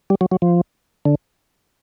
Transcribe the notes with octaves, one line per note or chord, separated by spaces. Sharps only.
G3
F#3
F#3
F3
D3